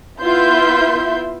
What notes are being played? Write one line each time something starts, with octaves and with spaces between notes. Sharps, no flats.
B3 E4 F4 E5 C6 G6